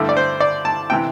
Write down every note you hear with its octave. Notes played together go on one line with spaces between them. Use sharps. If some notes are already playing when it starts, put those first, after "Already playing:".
Already playing: G2 D3 A3 E4
D5
C5
D5
A5
C3 E3 G5